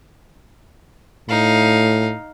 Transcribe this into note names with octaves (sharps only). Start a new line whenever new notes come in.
A2 D#4 F5